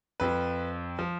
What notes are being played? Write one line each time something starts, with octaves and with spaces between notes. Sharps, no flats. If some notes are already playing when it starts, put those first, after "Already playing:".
F2 F3 B4
F3